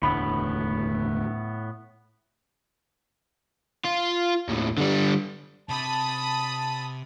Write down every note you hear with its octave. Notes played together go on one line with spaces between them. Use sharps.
E1 D2 A2 B3 B5
F4
D#2 A2
D3 G3
C3 A5 B5 D#6